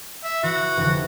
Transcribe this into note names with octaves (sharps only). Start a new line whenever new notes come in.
E5
E3 F#4
F1 D3 E3